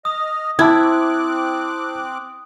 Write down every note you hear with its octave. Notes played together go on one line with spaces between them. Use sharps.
D#5 D#6 F6
C4 E4 A5 D6 E6 F#6 G#6